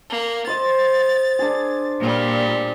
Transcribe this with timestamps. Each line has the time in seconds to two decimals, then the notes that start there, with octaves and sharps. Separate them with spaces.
0.10 A#3
0.47 C5 D#5 A6
1.39 D4 G#4
2.00 A#2 G3